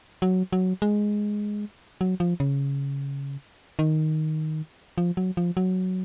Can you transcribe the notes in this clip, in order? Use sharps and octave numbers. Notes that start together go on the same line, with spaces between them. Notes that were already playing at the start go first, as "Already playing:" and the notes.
F#3
F#3
G#3
F#3
F3
C#3
D#3
F3
F#3
F3
F#3